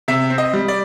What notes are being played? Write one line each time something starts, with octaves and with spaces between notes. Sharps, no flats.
C3 E5
C4
D#5
G3
D5